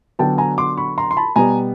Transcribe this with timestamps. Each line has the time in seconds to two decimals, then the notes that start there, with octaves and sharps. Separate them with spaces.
0.19 D3 F#3 B3 D4 G5 A5
0.38 G#5 A#5
0.58 C6 D6
0.78 B5 C#6
0.98 A#5 C6
1.11 C6
1.17 A5 B5
1.36 B2 G3 B3 G#5 A#5